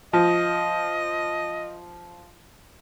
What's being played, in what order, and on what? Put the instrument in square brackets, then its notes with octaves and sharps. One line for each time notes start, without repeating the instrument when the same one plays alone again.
[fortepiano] F3 [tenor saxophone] D#5